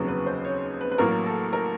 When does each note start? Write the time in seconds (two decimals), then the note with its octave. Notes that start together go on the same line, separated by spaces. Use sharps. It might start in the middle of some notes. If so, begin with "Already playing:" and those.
Already playing: F1 D#2 C#3 F#3 B3
0.08 B4
0.26 C5
0.45 C#5
0.81 B4
0.91 B4
0.98 A1 A2 F#3 A#3 A#4
1.26 A4
1.53 A#4